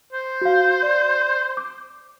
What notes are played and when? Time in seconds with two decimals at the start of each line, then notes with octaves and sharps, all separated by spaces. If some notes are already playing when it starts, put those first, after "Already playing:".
0.13 C5
0.41 F#4 F5
0.82 D5
1.57 D6